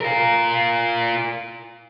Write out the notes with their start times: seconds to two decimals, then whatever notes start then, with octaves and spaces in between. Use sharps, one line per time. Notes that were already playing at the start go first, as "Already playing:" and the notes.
0.01 F4 A#4